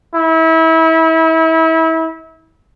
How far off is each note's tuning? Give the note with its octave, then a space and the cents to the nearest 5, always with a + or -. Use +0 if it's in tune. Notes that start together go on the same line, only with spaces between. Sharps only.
E4 -30